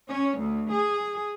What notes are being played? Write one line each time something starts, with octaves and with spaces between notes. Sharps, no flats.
C#4
D2
G#4